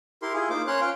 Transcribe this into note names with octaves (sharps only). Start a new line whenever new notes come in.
E4 G4 A#4 C6
E4 F4 G#4
A#3 D#4 F4 C5 D6
C#4 A#4 C5 C#5 C6 F#6
C#4 F4 F5 G5